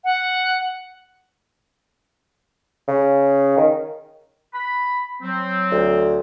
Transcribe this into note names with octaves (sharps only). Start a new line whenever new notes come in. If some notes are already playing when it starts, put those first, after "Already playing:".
F#5
C#3
D#3
B5
F#3 C4
D2